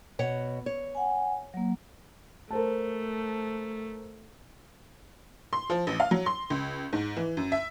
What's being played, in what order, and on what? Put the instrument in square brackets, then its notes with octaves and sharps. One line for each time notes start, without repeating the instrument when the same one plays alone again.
[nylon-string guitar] B2 C#5 F#5
C#5
[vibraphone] F#5 G#5
F#3 A#3
[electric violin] A3 [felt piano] A#4 C5 A5
[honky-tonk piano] C6
F3
A1
F5
F#3
C6
C#2
G#2
E3
F#2
E5